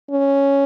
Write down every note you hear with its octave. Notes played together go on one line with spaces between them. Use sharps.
C#4